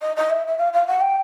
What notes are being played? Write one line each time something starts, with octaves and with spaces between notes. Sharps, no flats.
D#5
D#5
E5
E5
F5
F5
F#5
G5